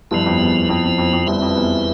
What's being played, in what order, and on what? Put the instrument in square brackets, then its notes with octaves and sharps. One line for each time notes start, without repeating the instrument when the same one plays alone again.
[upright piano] G1 G2 [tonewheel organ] F3 B3 E4
[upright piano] F2
E2
F2
F2
F2
F2
[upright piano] G1 G2 [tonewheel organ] C4 E4 B4 E5
[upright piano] F2
E2